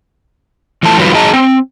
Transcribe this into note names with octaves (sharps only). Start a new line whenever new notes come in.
E2 E3 F3 A3 A5
F2 D#3 F#3 G3 F4 B4
F#3 D#4 G#4 D#5 A5 A#5
C4